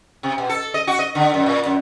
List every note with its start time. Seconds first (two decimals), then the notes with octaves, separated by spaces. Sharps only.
0.23 C3
0.38 B2
0.49 A4
0.74 D#5
0.87 F#4
0.99 D#5
1.15 D3
1.34 F#2
1.46 A#2
1.65 F#2